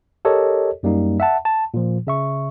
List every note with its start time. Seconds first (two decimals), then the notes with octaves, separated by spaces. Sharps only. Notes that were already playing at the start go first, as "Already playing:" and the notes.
0.25 G4 A4 A#4 C#5 D#5
0.83 F#2 G3 A#3 D#4
1.20 E5 F#5 A5
1.45 A5
1.74 A#2 F3
2.07 C#3 E5 C#6